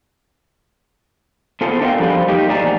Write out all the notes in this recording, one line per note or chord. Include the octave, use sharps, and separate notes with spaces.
B3 F4 G#4 A4 C5
D4 A4 A#4 E5 F5 G5
F3 G3 C4 F4 B4 C5
F3 A#3 D#4 G4
A2 A3 D4 G#4 D5 A#5
E2